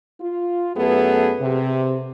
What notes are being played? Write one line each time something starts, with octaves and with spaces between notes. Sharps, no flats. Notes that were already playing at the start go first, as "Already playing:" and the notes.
F4
F#2 A3 B3 G#4 A4 B4
C3